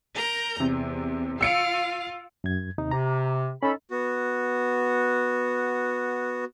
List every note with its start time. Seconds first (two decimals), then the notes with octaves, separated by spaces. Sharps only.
0.14 A#4 A#5 G6
0.60 E2 C3
1.41 F4 F5 E6 C#7 D7
2.44 F#2 G#6
2.78 D#2 C3 D#4
2.91 C3 A#5
3.63 C#4 D#4 A4 B5
3.91 B3 F#4